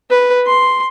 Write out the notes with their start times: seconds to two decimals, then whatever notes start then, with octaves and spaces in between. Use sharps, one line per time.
0.10 B4
0.46 C6